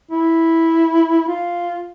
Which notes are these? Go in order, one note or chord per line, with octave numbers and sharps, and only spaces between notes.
E4
F4